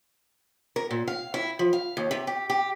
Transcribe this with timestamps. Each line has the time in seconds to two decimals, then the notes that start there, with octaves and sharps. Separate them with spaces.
0.76 A#4
0.91 A#2
1.08 F5
1.34 E4
1.59 F3
1.73 F5
1.97 D#2
2.11 C3
2.27 G4
2.50 G4